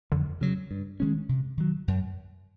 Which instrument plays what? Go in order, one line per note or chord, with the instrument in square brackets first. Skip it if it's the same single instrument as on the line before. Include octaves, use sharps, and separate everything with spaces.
[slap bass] F2 [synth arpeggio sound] D3
[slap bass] C#3 F#3
G2
D#3 G#3 C#4
C3
D#3 F#3
F#2